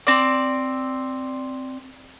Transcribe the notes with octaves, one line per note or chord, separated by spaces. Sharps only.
C4 D5